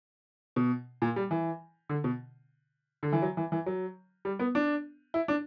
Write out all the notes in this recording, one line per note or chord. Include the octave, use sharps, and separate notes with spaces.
B2
A#2
G3
E3
D3
B2
D3
E3
F#3
E3
E3
F#3
G3
B3
D4
E4
D4